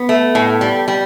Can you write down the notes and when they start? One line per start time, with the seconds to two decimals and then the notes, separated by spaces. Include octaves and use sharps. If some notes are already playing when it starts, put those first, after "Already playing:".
Already playing: B3
0.09 A3
0.35 A2
0.61 G3
0.88 G3